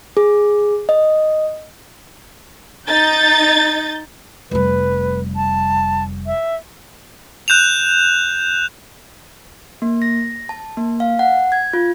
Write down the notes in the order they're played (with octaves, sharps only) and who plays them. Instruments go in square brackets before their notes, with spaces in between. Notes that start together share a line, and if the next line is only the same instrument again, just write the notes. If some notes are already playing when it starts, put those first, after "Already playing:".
[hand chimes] G#4
D#5
[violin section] D#4 G6 A6
[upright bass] F1 G3 [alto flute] B4
[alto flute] A5
E5
[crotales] F#6 G6 E7 F7
[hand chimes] A#3
A#6
A5
A#3
F5
F#5
G#6
F4